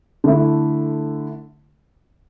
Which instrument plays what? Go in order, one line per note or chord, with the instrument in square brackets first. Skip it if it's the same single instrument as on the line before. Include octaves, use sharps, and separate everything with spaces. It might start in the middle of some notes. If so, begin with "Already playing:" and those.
[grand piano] D3 A3 E4